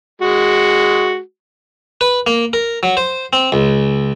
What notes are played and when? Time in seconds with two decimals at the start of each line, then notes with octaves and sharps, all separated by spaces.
0.22 G#3 F#4
2.01 B4
2.27 A#3
2.53 A#4
2.83 F#3
2.97 C5
3.33 C4
3.52 C#2